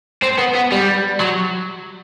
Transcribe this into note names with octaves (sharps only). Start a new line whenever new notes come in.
C4
B3
B3
G3
F#3